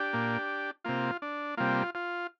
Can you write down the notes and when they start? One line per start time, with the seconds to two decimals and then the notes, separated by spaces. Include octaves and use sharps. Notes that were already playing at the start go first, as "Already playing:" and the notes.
Already playing: D4 G4
0.13 A#2 A#3
0.84 C3 A#3 F4
1.22 D4
1.57 C3 G3 A#3 F4
1.95 F4